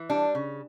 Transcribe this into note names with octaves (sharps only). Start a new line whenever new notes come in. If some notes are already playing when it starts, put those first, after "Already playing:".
Already playing: E3
G3 D4
C#3